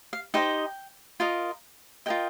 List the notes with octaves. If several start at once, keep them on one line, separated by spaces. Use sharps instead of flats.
F5
D#4 G4 C5 D#5 G5
F4 A#4 D#5
F4 A#4 D#5 G5